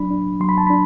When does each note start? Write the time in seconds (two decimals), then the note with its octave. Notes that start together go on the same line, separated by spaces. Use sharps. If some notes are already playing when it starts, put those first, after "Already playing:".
Already playing: F#3 D4 B5
0.10 D4
0.40 F#3 C6
0.49 B5
0.58 A5
0.67 D4 B5